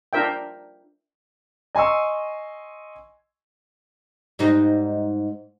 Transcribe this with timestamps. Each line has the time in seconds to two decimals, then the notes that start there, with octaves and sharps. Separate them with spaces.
0.13 D4 F4 A#4 E5 G5
1.75 D#5 G#5 C6 C#6 E6
4.39 G#2 G3 D#4